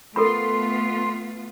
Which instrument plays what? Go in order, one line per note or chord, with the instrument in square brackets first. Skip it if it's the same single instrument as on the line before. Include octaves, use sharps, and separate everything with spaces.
[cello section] A3 B3 F4 [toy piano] A4 A#4 B5 [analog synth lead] C6